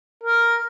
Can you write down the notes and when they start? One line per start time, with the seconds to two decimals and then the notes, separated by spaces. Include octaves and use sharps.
0.24 A#4